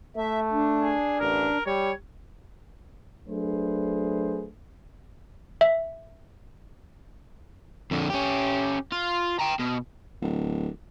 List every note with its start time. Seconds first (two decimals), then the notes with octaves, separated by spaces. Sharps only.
0.17 A3 E5
0.52 D4
0.82 G#4
1.20 A1 A#4
1.66 G3 C#5
3.28 F#3 A3 D4 G#4 B4 C5
5.61 E5
7.91 F2 D3
8.10 C#4 G4
8.92 F4
9.40 G5 A#5
9.60 B2
10.21 D1